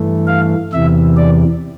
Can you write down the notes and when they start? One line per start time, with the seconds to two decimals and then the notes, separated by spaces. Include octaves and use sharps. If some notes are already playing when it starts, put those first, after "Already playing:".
Already playing: G2 E3 A3
0.27 F5
0.73 E2 C3 E3 E5
1.17 D5